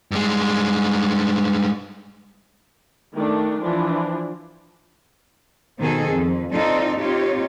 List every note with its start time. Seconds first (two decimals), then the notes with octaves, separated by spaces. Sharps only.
0.11 G2 G#3
3.15 D#3 A3 D4
3.61 E3 F3 D4
5.80 B2 D#3 C4 G#4 A4
6.12 F2
6.53 C4 D#4 F4 A4 D5
6.99 C4 D#4 F4 G4 C#5